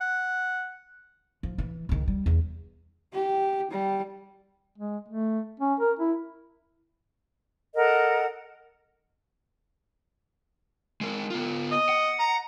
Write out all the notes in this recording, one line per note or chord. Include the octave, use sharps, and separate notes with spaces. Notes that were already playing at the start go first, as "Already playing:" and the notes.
F#5
F3
E3
C#2 D#3
G3
E2
G4
G3
G#3
A3
C#4
A#4
E4
A4 A#4 D#5 F#5
G#3 A#4
B3 F4
D#5
F#5
A#5